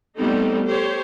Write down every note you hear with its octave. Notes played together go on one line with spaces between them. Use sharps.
G3 A3 B3 C4 D#4 A4
G4 A4 C5 C#5